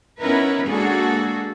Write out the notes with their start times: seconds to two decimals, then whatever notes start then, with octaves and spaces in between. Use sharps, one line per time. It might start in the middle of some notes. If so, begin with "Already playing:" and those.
0.20 B3 C#4 D#4 E4 A#4 B4
0.68 G#3 A#3 D4 F#4 G#4 A4